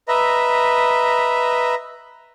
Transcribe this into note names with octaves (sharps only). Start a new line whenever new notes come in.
B4 D#5 E5 A#5